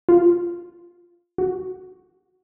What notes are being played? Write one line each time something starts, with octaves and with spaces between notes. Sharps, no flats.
F4
F#4